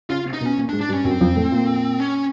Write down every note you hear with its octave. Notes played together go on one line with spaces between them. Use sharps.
C#3 C#4 F4
C3 C4
D#4
B2 B3
C#4
A#2 A#3
D4
G#2 G#3
D4
G2 G3
C#4
F#2 F#3 C4
F2 F3
A2 A3
A#2 A#3
C#4